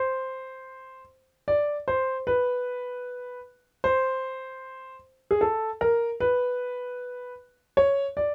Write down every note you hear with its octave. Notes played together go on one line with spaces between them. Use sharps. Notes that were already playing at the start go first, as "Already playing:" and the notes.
Already playing: C5
D5
C5
B4
C5
G#4
A4
A#4
B4
C#5
D5